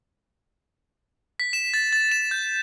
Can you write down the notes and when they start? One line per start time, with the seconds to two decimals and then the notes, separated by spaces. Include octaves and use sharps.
1.40 B6
1.53 E7
1.74 A6
1.93 A6
2.12 E7
2.31 G6